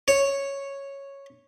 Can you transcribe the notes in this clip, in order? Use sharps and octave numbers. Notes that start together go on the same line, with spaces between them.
C#5